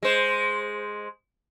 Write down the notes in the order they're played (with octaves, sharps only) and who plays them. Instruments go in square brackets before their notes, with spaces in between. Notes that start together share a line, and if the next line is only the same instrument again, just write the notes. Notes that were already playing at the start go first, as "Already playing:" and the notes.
[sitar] G#3 C5